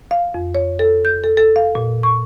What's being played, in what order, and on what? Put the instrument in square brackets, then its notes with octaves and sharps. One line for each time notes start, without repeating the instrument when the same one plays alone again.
[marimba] F5
F2
C#5
A4
G6
A4
A4
F5
A#2
C#6